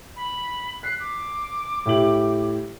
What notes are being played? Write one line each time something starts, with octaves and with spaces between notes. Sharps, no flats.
B5
F#6 B6 C7
D6
A2 G4 F#7